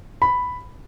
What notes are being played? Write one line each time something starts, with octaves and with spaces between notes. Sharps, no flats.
B5